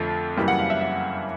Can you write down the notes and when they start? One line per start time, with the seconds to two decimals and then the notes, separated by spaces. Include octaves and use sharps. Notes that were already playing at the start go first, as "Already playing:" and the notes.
Already playing: F2 D3 F3 A3
0.37 F#2 C#3 E3 G3 A#3
0.48 F#5
0.59 F5
0.70 E5
0.81 E5